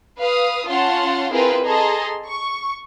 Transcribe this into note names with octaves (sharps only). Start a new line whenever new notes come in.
B4 F5 D#6
C#4 F4 F5 F#5 A5 C6
C4 E4 F4 G#4 A#4 B4
G#4 A4 D#5 A5 A#5 C6
C#6